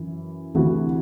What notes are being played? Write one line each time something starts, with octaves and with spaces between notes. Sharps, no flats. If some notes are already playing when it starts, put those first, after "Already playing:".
Already playing: F#2 E3
D2 C3 E3 F#4